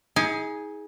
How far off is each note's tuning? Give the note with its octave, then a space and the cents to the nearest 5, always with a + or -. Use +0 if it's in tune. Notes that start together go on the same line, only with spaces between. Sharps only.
D#4 +40 G#4 +0